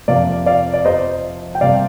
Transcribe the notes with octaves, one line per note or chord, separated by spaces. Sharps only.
F2 C3 F3 A#3 D5 F5
D5 F5
D5
C5 D#5
G5
C3 G3 A#3 D5 F5